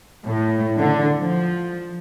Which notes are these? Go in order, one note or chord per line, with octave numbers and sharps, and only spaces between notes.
A2
D3
F3